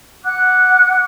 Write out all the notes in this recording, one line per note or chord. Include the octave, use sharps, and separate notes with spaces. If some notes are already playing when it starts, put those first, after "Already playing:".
F#5 D6 F#6